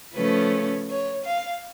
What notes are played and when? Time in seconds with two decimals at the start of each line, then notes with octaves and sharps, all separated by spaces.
0.14 C#3 F3 A3 C#4 B4
0.88 C#5
1.25 F5